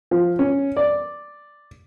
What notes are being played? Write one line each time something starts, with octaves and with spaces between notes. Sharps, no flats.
F3
C#4
D5